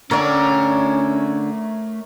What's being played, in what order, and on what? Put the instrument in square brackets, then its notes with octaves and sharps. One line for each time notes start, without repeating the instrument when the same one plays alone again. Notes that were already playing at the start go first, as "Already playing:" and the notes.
[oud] D3 D4 [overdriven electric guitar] A3 G5 [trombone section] C#4 [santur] A#4 C#5 D6